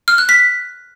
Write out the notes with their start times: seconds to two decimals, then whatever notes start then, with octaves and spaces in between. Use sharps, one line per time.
0.08 F6
0.18 F#6
0.29 B6